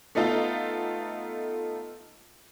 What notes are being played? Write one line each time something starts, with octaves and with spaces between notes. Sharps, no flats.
A3 B3 D#4 F4 A4